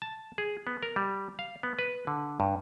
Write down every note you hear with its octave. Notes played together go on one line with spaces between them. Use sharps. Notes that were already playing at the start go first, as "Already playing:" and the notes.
A5
G#4
B3
A#4
G3
F5
B3
B4
D3
G2